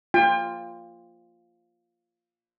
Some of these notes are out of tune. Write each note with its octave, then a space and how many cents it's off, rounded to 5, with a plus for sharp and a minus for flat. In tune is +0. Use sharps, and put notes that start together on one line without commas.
F4 +0 G5 +35